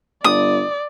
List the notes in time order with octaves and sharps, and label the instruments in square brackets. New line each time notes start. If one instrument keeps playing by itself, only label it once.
[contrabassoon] G1 [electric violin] D5 [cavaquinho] D#6